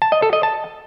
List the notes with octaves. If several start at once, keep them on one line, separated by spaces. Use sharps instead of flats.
A5
D#5
A4
D#5
A5